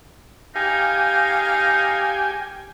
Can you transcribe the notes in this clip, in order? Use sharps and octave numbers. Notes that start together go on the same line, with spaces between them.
D#4 G4 F5 G#5